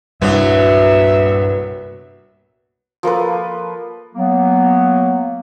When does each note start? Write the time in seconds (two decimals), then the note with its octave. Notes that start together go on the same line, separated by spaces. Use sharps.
0.22 C2 G2 A#2 F#3 B3 B4 E5
3.03 F3 A#3 A4 B4
4.14 F#3 A#3 B3